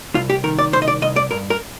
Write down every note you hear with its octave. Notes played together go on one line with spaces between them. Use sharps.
C2 F4
G4
D#3 A#4
D5
C2 C5
D#5
D5
C2 D#5
D5
G2 A#4
A#4